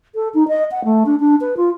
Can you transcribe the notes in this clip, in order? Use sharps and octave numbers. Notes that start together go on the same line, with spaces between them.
A4
D#4
D#5
F#5
A3
D4
D4
B4
F4